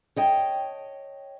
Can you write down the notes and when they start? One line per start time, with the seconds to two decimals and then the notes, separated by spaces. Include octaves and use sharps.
0.16 C#5 D#5 G5 A5